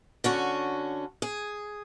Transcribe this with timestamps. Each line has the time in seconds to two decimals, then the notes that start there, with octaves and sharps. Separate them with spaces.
0.24 D3 C#4 F#4
1.22 G#4